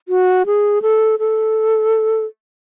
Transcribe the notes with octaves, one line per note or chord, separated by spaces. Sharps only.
F#4
G#4
A4
A4